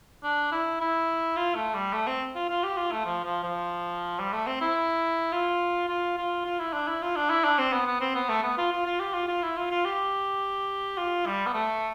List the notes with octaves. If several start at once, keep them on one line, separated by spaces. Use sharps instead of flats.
D4
E4
E4
F4
A3
G3
A3
C4
F4
F4
G4
F4
A3
F3
F3
F3
G3
A3
C4
E4
F4
F4
F4
F4
E4
D4
E4
F4
D4
E4
D4
C4
B3
B3
C4
B3
A3
B3
F4
F4
F4
G4
F4
F4
E4
F4
F4
G4
F4
G3
B3
A3